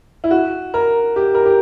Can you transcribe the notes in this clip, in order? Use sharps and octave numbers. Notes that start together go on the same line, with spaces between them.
E4
F#4
A#4
G4
A#4
G4